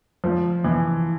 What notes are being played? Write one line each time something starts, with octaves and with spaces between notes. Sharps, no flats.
F3
E3